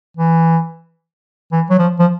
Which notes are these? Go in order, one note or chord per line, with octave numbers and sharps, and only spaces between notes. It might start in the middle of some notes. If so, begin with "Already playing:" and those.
E3
E3
F#3
F3
F3